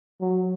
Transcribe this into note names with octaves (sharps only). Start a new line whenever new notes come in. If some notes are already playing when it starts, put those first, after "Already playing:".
F#3